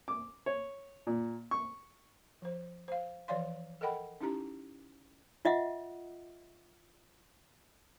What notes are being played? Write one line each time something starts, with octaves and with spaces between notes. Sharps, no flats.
D6
C#5
A#2
C#6
F3 C5
C5 F5
E3 F3 C#5 D5 F5 C6
A4 A#4 D#5 F#5 G5 B5
C#4 D#4 E4 G4 A#5
F4 D#5 E5 F#5